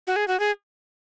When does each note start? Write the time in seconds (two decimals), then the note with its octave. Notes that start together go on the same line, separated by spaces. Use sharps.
0.07 F#4
0.16 G#4
0.28 F#4
0.40 G#4